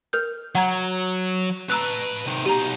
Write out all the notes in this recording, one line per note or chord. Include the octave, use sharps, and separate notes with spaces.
A#4 F6 G6
F#3 F#5 A#5 G#6
B4 A5 A#5 E6 F#6
C3 D#3
B2 D#4 G4 A#5